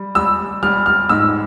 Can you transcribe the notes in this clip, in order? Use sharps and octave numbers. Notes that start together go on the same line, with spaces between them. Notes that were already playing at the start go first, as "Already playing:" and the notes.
Already playing: G3
G3 E6
G3 F6
F6
G#2 E6